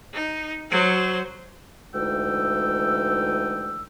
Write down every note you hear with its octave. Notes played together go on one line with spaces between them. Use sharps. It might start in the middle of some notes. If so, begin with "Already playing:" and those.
D#4
F#3 C5
D2 E3 G#3 D#4 G5 E6